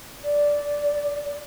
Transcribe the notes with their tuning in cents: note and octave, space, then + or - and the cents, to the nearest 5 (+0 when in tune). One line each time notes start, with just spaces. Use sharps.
D5 -10